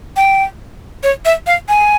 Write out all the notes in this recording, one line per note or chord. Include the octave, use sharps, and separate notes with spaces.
G5
C#5
E5
F5
G#5